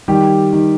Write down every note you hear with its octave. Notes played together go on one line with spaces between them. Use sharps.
D#3 G3 G4
D#3